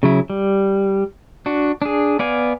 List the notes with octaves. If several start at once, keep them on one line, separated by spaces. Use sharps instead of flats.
C#3 F#3 E4
G3
D4 F#4
D4 G#4
B3 D5 F5 G#5